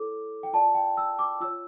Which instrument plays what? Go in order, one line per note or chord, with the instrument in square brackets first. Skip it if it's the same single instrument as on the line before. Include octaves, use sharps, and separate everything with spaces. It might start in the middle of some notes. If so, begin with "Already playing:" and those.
Already playing: [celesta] E4 A4 C#5 D6
G5
F4 A#4 D5 A5
G5
E6
D6
F4 C#5 E6